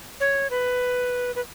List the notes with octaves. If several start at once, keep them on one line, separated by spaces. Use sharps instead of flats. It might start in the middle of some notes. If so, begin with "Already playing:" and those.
C#5
B4
B4